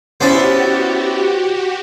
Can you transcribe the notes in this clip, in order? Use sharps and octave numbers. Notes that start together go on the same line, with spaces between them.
B3 C#4 E4 F#4 G4 C5 D5 G5